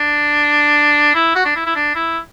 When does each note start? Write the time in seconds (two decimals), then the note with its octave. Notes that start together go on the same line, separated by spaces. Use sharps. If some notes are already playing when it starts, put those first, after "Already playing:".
Already playing: D4
1.15 E4
1.35 F#4
1.45 D4
1.56 E4
1.66 E4
1.76 D4
1.95 E4